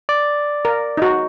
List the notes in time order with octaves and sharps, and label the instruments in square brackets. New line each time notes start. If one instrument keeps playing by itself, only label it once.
[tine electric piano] D5
[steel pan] A#4
D#4 F#4